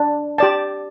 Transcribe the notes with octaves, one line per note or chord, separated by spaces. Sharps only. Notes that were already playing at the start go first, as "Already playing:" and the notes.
Already playing: D4
G4 D5 A5